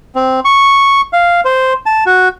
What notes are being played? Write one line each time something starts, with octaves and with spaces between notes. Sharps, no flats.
C4
C#6
F5
C5
A5
F#4